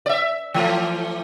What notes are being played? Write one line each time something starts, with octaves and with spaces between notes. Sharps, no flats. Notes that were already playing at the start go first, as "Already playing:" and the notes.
D5 E5
E3 A3